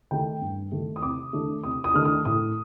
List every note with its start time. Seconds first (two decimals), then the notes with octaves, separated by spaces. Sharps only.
0.11 D#3 A3 G5
0.41 G2
0.72 D#3 A3
0.96 D#6
1.02 C3 D6
1.33 D#3 A3 D4
1.63 C3 D#6
1.84 D#6
1.94 D#3 A3 D4 F6
2.05 D#6
2.25 A2 D#6